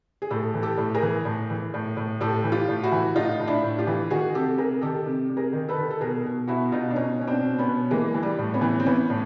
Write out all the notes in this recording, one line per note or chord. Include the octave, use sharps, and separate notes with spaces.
G#4
A2 G4 A4
E3
G4 A4
A2
G#4 A#4
E3
A2
E3
A2
A2
A2 G4 A4
E3
F4 G4
A2
E4 F#4
E3
A2 D#4 F4
A2
D4 E4
A2
F4 G4
E3
D#3 F#4 G#4
C3 G4 A4
C3 G#4 A#4
D#3 G4 A4
C3
C3
G#4 A#4
D#3
A4 B4
D#3
A4
B2 G#4 A#4
B2
B2 E4 F#4
B2 D#4 F4
D4
B2 C#4 D#4
B2 C#4
C4 D4
B2
B3 C#4
B2
E3 G#3 A#3
E3
G3
A2
B3 C#4
E3
C4
E3 B3 C#4
A2